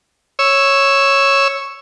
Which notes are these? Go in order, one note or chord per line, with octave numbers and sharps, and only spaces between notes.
C#5 E6